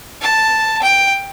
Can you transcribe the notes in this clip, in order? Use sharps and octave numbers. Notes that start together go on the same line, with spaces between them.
A5
G5